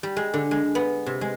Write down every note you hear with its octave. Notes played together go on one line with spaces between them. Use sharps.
G3
G#3
D3
G#3
B3
C3
G#3